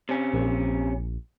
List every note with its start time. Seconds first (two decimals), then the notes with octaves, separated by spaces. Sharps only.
0.09 C3 C#4
0.33 A#1